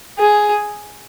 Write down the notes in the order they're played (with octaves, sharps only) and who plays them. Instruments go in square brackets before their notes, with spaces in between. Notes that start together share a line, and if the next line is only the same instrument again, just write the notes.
[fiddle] G#4